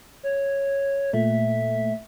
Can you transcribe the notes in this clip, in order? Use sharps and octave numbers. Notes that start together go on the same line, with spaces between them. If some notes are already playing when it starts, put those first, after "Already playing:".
C#5
A#2 A3 E5